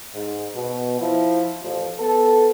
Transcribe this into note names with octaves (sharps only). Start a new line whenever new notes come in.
G#2
B2
F3 E4
A1 F3
B3 A4